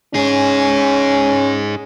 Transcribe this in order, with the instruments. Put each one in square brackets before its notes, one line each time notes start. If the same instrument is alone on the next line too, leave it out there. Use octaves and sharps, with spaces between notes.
[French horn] C#4 [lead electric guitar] D#4 G#4